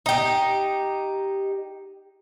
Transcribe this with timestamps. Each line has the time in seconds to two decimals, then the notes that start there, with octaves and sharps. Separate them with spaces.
0.06 D#4 G4